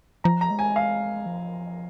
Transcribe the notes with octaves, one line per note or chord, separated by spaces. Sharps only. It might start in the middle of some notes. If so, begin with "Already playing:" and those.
F3 A#5
A#5
G#3
G#5
F5
F3